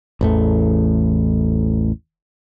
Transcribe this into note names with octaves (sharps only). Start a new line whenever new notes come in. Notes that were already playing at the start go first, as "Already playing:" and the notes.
A1 E2 A3